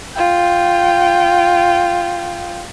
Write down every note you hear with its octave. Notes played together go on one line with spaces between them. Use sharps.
F4 G5